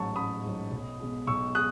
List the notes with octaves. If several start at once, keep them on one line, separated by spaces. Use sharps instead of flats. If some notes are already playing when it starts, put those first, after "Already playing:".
Already playing: A1 G#2 F#3 A5 C#6
A1 B5 D#6
G#2 F#3
B1
B2 G#3
B1 C#6 E6
G#3 D#6 F#6